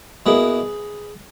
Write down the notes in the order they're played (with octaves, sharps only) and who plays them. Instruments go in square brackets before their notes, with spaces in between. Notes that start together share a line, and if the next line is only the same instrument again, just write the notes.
[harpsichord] B2 A#3 E4 G#4 B4